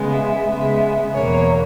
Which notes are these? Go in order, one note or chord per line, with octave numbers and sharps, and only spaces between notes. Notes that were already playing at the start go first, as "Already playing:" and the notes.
Already playing: C#3 G#3 B3
E5
C#3 G#3 B3 E5
E2 B2 A#3 C#5